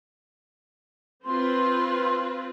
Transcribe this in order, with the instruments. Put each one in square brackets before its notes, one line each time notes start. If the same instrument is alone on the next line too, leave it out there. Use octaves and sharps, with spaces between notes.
[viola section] C4 F4 B4 [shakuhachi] C6